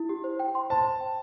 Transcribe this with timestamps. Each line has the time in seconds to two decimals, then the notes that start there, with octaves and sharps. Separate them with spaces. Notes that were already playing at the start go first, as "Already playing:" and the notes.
Already playing: E4
0.09 G4
0.24 C5
0.39 G5
0.55 C6
0.70 C5 A5
0.86 C5
1.01 G5